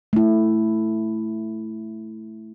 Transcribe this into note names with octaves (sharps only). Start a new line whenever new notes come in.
A3 E4